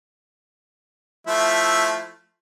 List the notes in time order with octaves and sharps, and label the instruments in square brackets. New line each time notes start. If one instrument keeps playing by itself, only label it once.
[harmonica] F3 A3 E4